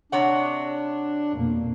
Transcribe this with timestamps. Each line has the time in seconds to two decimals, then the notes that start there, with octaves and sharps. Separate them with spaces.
0.12 C3 D4 C#5 F#5
1.35 F2 B2 A#3